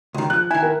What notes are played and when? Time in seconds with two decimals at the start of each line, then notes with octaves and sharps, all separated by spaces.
0.14 C#2 D#3
0.30 F3 F#6
0.51 D#3 E4 G#5
0.62 A#4